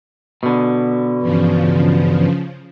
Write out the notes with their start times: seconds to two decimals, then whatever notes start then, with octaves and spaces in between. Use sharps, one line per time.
0.43 B2 D3
1.22 G2 C#3 E3 F3